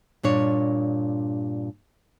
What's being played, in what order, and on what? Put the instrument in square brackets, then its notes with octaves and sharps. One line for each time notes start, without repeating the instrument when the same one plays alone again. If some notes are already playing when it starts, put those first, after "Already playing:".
[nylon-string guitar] G2 A#2 D4 C#5